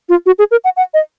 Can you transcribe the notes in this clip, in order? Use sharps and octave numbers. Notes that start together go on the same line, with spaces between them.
F4
F#4
G#4
A#4
F#5
F#5
D#5